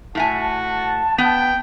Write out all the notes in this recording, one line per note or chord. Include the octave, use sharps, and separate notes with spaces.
A2 F#4 E5 G#5 A5
A5
B3 G5